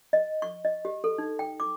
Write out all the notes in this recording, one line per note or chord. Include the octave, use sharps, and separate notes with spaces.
D#5
C#6
D#5
G4
A4
D#4
G5
D6